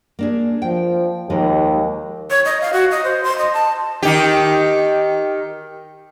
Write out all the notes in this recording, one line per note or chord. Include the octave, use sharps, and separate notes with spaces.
A#3 D4 G#4
F3 G5
D#2 F3 G#3 G4
C#5
D#5
F5
F#4
D#5
C5
C6
D#5
A5
D#3 G4